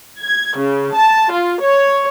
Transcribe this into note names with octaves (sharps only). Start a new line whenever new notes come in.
G#6
C#3
A5
F4
C#5